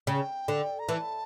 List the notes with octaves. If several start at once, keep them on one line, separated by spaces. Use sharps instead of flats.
C#3 G5
D3
A#5
E3 A5